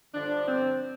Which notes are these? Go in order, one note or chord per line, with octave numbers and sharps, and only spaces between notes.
G2 D3 F3 D4
C4